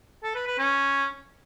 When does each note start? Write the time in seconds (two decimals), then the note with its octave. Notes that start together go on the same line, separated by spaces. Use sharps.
0.23 A4
0.35 B4
0.47 B4
0.58 C#4